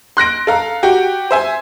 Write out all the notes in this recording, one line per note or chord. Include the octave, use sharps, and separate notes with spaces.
C6 F#6 A#6 D7
A4 F5 A#5
F#4 G4 G5
C5 E5 G#5